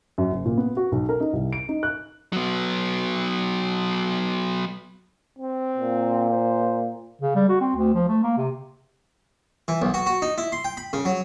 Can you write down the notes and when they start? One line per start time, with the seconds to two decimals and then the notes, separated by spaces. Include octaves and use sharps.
0.18 F#2
0.32 F#1
0.45 A#2
0.57 B3
0.77 F#4
0.92 B1
1.09 A#4
1.20 D#4
1.33 C2
1.53 D7
1.69 D#4
1.83 F#6
2.33 F#3 B3
5.39 C4
5.78 A#2
6.31 C5
7.21 C#3
7.35 G3
7.49 F#4
7.60 C4
7.76 D2
7.94 F3
8.08 A3
8.23 A#3
8.37 C3
9.68 E3
9.82 B1
9.94 F#4
10.06 F#4
10.22 D#4
10.38 E4
10.52 C6
10.64 G5
10.77 B5
10.93 C#3
11.05 F#3